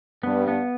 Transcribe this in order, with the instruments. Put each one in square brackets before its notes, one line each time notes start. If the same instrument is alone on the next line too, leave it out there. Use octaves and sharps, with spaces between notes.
[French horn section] G2 [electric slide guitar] B3
[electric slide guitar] B3